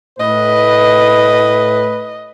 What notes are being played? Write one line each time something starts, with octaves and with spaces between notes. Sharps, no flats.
A2 B4 D#5